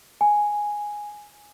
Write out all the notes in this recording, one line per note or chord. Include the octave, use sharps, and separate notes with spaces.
G#5